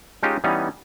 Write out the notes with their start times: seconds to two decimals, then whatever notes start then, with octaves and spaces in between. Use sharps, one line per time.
0.23 G#3 C#4 D#4 F4 G4
0.44 E3 G3 B3 C#4 D#4